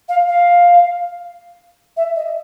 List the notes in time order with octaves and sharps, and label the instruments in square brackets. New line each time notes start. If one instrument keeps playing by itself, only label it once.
[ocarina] F5
F5
E5
D#5